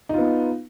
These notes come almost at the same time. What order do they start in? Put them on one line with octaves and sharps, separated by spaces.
D#4 F4 B3